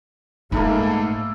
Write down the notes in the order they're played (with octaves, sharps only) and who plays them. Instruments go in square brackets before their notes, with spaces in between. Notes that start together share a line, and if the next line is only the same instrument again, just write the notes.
[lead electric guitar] G#2 [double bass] A3 [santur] A#3 A4 B5 [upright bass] D#4 F4